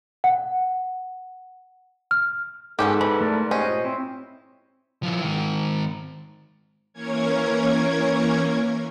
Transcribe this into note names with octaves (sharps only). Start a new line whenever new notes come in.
F#5
F6
G#2 B3 C#4 G4 A4
E3 B5
A3 A#4 D5
D#2 C#4 C5 D#5
A#2
C4 E4
F3 E4
D#3 G#3
E3 A#3 C#4 A#4 C#5 G#6